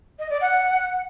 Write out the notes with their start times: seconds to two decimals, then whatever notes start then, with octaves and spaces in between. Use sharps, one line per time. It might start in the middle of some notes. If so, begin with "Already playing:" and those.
0.18 D#5
0.30 D5
0.41 F#5